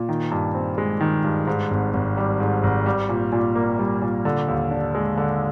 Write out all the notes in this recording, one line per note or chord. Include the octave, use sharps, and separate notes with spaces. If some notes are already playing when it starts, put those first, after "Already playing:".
Already playing: A#2
D#3
G2
C4
G#3
D#3
G2
G#2
G#1
G#1
G3
G#2
G#1
G3
A#2
A#2
A#3
G3
A#2
D3
D#2
D4
G#3
D3